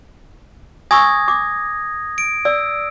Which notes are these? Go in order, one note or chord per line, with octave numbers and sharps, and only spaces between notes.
G#5 C#6 D#6 E6 G#6 A#6
D6
D7
D5 E6